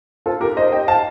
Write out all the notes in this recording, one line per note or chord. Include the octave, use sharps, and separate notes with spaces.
F4 A4
G4 A#4
C5 D#5
D#5 G5
F5 A5